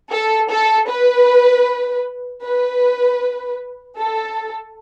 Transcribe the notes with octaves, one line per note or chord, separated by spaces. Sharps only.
A4
A4
B4
B4
A4